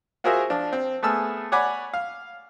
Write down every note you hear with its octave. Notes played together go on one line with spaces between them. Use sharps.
F4 F#4 G#4 A#4 C5 E5
F3 D4 F4
C4
A3 B3 G#4 A5 E6 F6
C#5 D5 F#5 G#5 B5 D6
F5